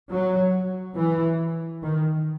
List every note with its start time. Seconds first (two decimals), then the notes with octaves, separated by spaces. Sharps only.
0.11 F#3
0.97 E3
1.83 D#3